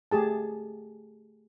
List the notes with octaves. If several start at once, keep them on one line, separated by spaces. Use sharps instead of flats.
A3 G4 G#4 A5